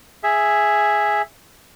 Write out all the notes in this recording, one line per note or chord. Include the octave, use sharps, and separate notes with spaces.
G#4 E5